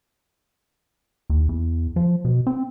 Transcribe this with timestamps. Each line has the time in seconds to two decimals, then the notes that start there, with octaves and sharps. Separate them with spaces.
1.30 D#2
1.49 E2
1.96 F3
2.25 B2
2.47 C4